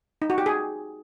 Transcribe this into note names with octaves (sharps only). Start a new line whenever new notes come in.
D#4
F#4
G4
G#4